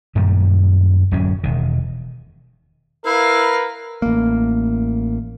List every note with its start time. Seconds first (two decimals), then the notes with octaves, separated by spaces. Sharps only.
0.15 F#2 A#2 D#3 G3
1.11 D1 F#2 F#3 C#4
1.43 E1 D#3
3.06 E4 A#4 B4 F5
4.02 A1 A#3